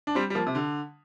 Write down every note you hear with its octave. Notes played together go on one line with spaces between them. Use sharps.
D4
G3 C4
G3
F3 A#3
C3
D3